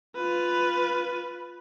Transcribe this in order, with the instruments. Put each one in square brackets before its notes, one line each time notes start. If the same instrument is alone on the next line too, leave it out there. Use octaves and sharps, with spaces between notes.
[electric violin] F4 B4